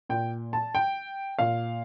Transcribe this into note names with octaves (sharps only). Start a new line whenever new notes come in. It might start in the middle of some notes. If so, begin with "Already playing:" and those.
A#2 G5
A5
G5
A#2 F5